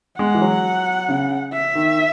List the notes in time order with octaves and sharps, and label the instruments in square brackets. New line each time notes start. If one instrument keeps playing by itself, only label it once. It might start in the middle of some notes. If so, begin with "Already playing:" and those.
[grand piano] G#3 [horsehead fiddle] F#5
[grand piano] E3
F#3
C#3
[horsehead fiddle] E5
[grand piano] D#3